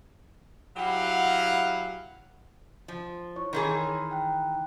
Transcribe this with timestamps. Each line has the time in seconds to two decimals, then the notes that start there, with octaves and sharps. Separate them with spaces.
0.76 F#3 E4 G4 F5 F#5
2.88 F3
3.36 E4 C#5 C#6
3.53 D#3 E3 G#4 A#4 C#5 C6
4.11 G5 F#6